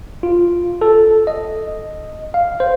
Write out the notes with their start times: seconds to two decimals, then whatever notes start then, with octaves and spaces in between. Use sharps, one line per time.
0.23 F4
0.81 A4
1.27 D#5
2.34 F5
2.60 C5